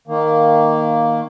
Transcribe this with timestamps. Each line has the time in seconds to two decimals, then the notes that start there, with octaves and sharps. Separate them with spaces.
0.08 D#3 A#3